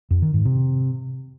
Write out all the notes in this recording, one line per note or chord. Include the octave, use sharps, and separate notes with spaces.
F2
D#3
G#2
C3